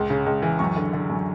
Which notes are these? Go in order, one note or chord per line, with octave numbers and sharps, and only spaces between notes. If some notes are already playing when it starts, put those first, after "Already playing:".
Already playing: C#2
C#3
C#2
E3
F#2 C#6
D3
D3
F#2